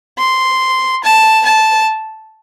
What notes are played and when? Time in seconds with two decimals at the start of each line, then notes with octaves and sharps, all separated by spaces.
0.18 C6
1.03 A5
1.45 A5